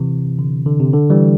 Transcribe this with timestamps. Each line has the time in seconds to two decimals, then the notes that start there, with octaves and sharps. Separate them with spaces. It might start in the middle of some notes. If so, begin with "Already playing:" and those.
Already playing: C3 E3
0.39 D3
0.66 D3
0.80 C3
0.93 D3
1.10 E3 G3